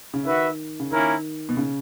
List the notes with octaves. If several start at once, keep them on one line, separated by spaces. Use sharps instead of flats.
C#3
D#3 F#4 B4 E5
C#3
D#3 A#3 C#4 E4 A#4
B2
C#3